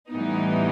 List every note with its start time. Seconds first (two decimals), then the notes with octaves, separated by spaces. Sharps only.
0.13 A2 E3 G3 B3 D#4